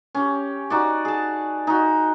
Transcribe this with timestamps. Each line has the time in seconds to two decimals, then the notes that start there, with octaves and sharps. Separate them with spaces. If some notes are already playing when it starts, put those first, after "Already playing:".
0.15 C#4 G4
0.70 D#4 F#4 D5
1.05 G#4 A5
1.67 D#4 F#4